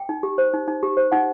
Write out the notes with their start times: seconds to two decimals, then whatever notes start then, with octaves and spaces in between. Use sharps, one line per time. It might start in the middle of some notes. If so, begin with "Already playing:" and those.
Already playing: G5
0.09 D#4
0.23 G4
0.38 C5
0.53 D#4
0.68 D#4
0.83 G4
0.97 C5
1.12 D#4 F#5